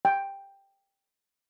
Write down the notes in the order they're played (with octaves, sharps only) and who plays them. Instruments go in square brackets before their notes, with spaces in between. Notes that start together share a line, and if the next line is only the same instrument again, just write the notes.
[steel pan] G5